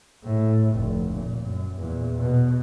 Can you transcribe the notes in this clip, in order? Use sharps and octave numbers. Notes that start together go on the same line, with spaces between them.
A2
F1 D2
A#2
F#2
E2 A#2
B2